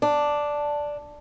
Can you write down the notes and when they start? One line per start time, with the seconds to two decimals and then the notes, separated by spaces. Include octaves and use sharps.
0.02 D4